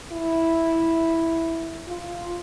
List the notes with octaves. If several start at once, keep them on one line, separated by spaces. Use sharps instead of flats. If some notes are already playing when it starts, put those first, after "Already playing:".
E4
F4